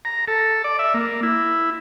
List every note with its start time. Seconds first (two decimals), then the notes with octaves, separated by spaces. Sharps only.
0.05 A#5
0.28 A4
0.64 D5
0.79 E5
0.94 A#3
1.23 E4